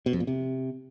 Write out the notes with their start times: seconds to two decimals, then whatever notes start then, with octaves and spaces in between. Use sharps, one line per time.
0.06 B2
0.13 F2
0.20 A#2
0.27 C3